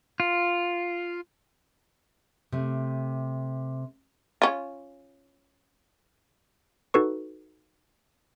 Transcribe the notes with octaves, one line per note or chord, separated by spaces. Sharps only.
F4
C3 A3
C#4 F4
D#4 F#4 A4 B4 C#6